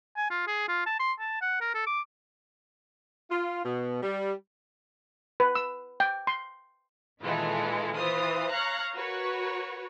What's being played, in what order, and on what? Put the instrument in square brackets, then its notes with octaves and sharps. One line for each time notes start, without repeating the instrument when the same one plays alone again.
[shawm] G#5
F4
G#4
F4
A5
C6
A5
F#5
A#4
A4
D6
[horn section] F4
B2
G3
[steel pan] B4
E6
G5
C6
[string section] A#2 D#3 E3 G#3 F4 A4
E3 F4 C5 D#6
C#5 F5 A#5 F#6
F#4 A#4 B4 C#5